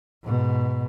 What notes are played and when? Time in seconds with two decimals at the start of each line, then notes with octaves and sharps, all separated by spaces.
0.24 G#2 B2